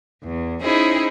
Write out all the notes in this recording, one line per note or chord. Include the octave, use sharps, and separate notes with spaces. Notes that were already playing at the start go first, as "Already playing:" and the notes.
E2
C#4 D#4 E4 G#4 C5